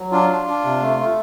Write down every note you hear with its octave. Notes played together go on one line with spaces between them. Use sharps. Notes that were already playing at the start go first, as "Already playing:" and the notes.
Already playing: F#3
D4 F4
D4
D4
C3
A3
A3